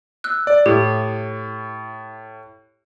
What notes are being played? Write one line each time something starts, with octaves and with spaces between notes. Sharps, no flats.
E6 F#6
D5
A2 G4